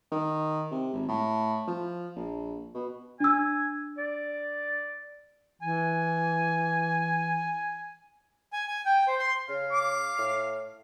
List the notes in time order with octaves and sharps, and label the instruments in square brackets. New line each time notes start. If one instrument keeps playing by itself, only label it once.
[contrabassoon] D#3
C3
G#1
A2
F3
A#1
B2
[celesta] D4 E6 [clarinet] G#5
[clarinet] D5
[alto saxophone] E3 [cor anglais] G#5
[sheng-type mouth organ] G#5
G#5
G5
C5
C6
[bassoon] C#3 [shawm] F5
[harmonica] D6
[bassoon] A2